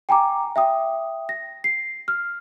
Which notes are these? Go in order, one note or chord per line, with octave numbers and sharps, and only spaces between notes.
G5 G#5 A#5 D6
E5 G5 D#6
A#6
C7
F6